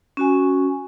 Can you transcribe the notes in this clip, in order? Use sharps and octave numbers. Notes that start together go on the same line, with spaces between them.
C#4 F#4 G#5